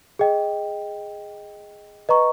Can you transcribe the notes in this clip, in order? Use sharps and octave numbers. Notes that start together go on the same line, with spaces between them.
G#4 D#5 G5
B4 D#5 A#5 C#6